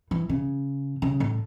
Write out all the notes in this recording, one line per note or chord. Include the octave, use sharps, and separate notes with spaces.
E3
C#3
C#3
A2